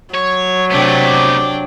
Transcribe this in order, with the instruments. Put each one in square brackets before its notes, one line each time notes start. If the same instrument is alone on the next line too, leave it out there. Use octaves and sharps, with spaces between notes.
[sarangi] F#3 [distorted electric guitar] C#5
[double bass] C3 [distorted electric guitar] A3 B3 [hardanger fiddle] D4 G4